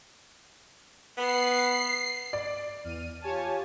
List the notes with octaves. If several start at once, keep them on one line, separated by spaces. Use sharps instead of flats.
B3 C7
D5
E2 F6 D#7
F4 G4 C#5 G#5 A5